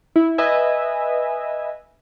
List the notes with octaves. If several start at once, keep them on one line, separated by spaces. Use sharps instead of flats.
E4
B4 D#5 E5 G#5